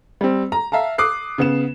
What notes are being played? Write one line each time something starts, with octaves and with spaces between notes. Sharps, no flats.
G3 C4
A#5
E5 F5 A5 A#5
D6 D#6 F#6 C7
C#3 B3 E7